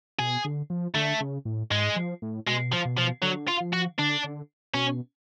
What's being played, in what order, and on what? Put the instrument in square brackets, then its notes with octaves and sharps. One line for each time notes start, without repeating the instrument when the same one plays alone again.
[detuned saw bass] B2 [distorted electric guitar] G#4
[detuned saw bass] D3
F3
[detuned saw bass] D3 [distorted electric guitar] A3
[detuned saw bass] C#3
A2
[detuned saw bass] G#2 [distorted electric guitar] G#3
[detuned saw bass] F3
A2
[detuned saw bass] B2 [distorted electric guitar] G#3
[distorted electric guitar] F3
[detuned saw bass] B2
[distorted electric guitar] F3
[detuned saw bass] D3 [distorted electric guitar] F#3
[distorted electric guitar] F4
[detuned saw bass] F3
[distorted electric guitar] F#4
[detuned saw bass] D3 [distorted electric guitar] D4
[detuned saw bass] D3
[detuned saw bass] B2 [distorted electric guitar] C#4